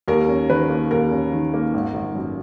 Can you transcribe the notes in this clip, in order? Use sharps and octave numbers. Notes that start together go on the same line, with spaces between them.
D#2 A#4
C#4
D#3 B4
A#3
D#2 A#4
C#4
D#3
A#3
G#1
G#1
F#2